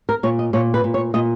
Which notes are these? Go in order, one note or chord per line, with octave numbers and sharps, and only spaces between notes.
A#4
A#2 C#5
D#5
A#2 C#5
B4
A#2
C#5
A#2 D#5